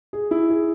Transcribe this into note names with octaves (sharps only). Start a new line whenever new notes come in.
G#4
E4
G#4